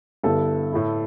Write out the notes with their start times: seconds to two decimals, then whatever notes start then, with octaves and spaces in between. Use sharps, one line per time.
0.23 G2 D3 B3 E4 A4
0.72 A2 A3 E4